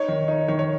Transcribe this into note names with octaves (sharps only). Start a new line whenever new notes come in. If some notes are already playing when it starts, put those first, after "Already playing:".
Already playing: D#4 C#5
D#3
D#4
D#3 C#5
C#5